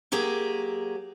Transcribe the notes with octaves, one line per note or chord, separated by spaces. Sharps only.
F#3 A#3 G4 G#4